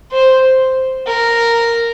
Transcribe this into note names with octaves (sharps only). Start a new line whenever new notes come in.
C5
A#4